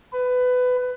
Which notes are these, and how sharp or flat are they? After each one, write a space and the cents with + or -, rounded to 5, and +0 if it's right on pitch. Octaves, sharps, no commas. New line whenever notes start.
B4 +20